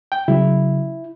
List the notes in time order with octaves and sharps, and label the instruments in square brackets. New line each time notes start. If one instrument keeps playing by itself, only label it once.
[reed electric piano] G5
[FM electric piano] C#3 F#3 [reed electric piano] E4